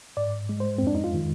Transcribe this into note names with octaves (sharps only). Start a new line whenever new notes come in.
G#2 D5
G#3
C5
C4
F2 D4
D#4
F4
D#3